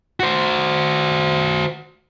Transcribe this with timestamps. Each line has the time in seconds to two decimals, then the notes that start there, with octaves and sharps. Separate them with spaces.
0.20 F#4 C5